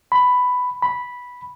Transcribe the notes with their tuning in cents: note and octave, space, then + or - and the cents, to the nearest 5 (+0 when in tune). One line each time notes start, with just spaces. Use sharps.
B5 +10
B5 -5